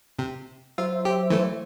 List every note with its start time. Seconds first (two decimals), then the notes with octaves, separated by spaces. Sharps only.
0.19 C3
0.78 F#3 F4 C5 E5
1.05 G4
1.30 E3 A3